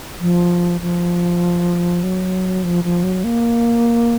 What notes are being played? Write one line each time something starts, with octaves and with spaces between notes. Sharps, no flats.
F3
F3
F#3
F3
F3
F#3
A#3